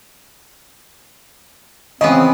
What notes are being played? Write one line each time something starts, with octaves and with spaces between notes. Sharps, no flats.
C#3 E3 B3 C4 D#5